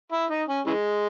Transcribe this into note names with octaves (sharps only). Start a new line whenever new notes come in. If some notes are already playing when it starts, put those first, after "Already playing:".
E4
D#4
C#4
C#3 E3 G#3